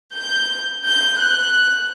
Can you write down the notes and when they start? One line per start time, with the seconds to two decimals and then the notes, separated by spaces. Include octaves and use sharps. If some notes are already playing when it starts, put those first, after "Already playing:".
0.15 G6
0.87 G6
1.19 F#6